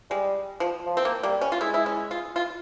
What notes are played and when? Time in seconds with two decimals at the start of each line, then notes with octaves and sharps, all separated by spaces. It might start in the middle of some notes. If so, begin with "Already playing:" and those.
0.10 G3 G#3
0.60 F3
0.86 F3
0.97 C4
1.05 A#3
1.23 G3 A#3
1.41 C#4
1.52 F4
1.61 G#3 E4
1.74 E4
1.86 C#4
2.11 F4
2.36 F4